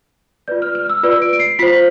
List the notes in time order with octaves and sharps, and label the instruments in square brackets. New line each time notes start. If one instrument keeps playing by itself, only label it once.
[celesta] F4 B4 D5 G6
F6
F6
E6
F4 B4 D5 E6
D7
D7
C7
F4 C5 B6